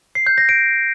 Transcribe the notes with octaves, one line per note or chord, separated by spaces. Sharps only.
C7
G6
A#6
D7